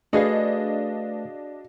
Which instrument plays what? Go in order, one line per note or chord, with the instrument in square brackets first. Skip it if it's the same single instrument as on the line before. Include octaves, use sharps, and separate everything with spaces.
[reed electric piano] A3 B4 [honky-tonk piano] D4 D#5 [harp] F#4 G#4 F5